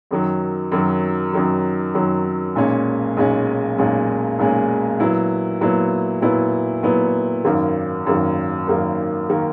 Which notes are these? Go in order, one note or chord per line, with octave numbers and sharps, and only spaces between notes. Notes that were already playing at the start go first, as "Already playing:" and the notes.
F#2 D#3 F#3
F#2 D#3 F#3
F#2 D#3 F#3
F#2 D#3 F#3
B1 A#2 G#3 C#4
B1 A#2 G#3 C#4
B1 A#2 G#3 C#4
B1 A#2 G#3 C#4
A#2 F#3 B3 E4
A#2 F#3 B3 E4
A#2 F#3 B3 E4
A#2 F#3 B3 E4
G#1 F#2 D#3 A#3
G#1 F#2 D#3 A#3
G#1 F#2 D#3 A#3
D#3 A#3